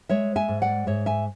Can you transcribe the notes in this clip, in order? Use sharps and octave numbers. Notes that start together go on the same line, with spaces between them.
G#3 C#5 E5
E5 G#5
G#2
D5 F#5
G#2 C#5 E5
E5 G#5